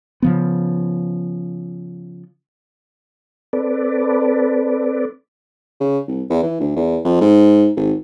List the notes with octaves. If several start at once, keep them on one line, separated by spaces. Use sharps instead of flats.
C#3 F3 B3
C4 A4 B4 D5
C#3
C2
E2
E3
D2
E2
F2
G#2
G#1